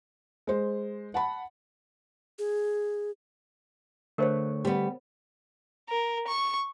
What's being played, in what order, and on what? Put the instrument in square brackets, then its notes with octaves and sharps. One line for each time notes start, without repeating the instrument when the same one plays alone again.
[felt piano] G#3 C5
F#5 A5 B5
[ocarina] G#4
[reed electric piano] D3 A3 C#6 [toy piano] A#4 C5 C#5
[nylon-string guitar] G3 B3
[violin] A#4
C#6